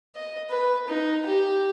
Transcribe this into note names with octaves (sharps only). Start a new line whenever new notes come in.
D#5
B4
D#4
G4